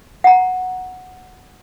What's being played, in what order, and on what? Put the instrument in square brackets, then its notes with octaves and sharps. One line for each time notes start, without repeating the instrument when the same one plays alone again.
[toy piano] F#5 A#5